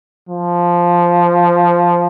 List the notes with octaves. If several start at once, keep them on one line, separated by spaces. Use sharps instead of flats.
F3